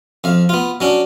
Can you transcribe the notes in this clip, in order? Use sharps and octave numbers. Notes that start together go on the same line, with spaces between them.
F2 F5
B3 F4
F#3 C#4 D4